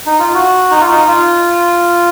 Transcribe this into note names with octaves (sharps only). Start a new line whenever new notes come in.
D#4
F4
F#4
D#4
F4
D#4
F4